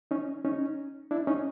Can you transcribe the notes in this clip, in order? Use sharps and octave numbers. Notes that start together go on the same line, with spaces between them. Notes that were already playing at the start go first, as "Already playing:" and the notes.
C#4 D#4
C#4 D#4
D4 E4
C#4 D#4